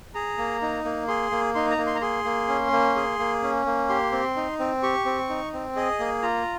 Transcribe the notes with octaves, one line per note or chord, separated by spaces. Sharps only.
G#4 A#5
A#3
D#4
A#3
G#4 C6
A#3
D#4 C6
A#5
A#3
C6
A#5
G#4 C6
A#3
C#4
A#3
G#4
A#3
C#4
A#3
G4 C6
C4
D#4
C4
G4 C#6
C4
D#4
C4
G#4 D#5
A#3
F4 A#5